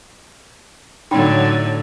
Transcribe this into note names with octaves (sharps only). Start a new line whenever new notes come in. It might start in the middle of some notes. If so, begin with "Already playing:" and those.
A2 D3 F#3 D#4 G5 B5